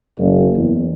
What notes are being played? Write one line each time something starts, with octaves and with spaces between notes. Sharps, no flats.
F#1
E2